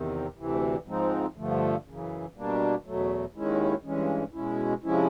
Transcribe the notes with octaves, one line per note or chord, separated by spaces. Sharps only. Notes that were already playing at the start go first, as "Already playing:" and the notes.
Already playing: E2 C3 D#3
D2 C3 E3
G#2 F3 G#3 C4 D#4
G2 D3 F3 A3
F#2 C#3 E3
B2 G3 A#3 D4
E2 B2 F#3 A3
D#2 D#3 G#3 C#4 E4
G2 E3 G#3 C#4
B2 G#3 C#4 E4
C3 F3 G#3 C#4 E4